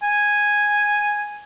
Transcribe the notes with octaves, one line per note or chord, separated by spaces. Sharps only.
G#5